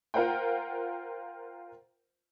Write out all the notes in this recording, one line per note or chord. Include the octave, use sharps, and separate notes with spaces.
F4 A#4 C5 F#5 G5